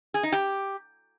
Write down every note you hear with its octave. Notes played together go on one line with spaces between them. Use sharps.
G#4
D#4
G4